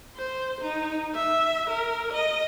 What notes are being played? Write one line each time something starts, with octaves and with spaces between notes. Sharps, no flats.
C5
D#4
E5
A#4
D#5